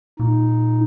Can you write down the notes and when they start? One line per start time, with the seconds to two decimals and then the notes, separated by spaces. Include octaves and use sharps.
0.20 A#2 D#4